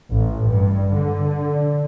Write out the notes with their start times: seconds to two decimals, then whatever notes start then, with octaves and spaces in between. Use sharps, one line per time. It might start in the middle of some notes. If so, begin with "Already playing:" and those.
0.13 A1
0.47 G2
0.96 D3